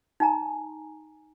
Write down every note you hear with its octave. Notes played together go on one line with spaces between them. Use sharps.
D#4 G#5 A#5